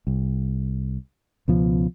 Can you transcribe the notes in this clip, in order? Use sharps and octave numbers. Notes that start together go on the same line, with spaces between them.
C2
C#2 B2 F3